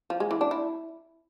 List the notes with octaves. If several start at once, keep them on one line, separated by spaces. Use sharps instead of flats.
F3
G#3
E3
D4
E4